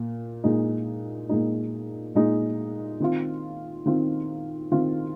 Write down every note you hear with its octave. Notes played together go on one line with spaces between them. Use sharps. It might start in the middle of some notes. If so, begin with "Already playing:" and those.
Already playing: A#2
A#2 G#3 D#4
A#2 G#3 D#4
A#2 G#3 D#4
D#3 C4 F4
D#3 C4 F4
D#3 C4 F4